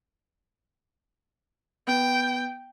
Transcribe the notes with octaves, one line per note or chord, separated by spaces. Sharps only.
B3 G5